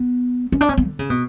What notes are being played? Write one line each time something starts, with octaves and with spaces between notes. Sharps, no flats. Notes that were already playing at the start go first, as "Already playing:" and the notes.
Already playing: B3
C#4
D4
C#4
B3
D3
C#3
B2